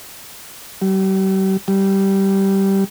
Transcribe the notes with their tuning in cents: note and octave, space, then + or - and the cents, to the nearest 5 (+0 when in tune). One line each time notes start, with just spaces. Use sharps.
G3 -40
G3 -10